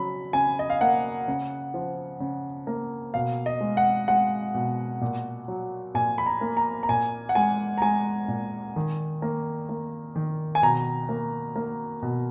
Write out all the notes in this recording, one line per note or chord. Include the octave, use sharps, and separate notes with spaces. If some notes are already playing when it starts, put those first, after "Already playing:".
Already playing: C#3 F#3 B5
C#3 G#5
D#5
F5
A#3 F#5
C#3
F3
C#3
A#3
B2 F5
D#5
G#3
F#5
G#3 F#5
B2
A#2
F#3
A#2 G#5
B5
A#5
A#3
A#5
A#5
A#2 G#5
F#5
G#3 G#5
A#5
G#3 G#5
A#2
D#3
A#3
A#3
D#3
G#5
B2 A#5
A#3
A#3
B2